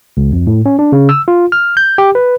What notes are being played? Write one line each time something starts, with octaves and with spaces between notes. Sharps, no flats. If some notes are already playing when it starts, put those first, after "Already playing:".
C#2
F2
A2
C#4
D4
C#3
E6
F4
F6
G6
G4
B4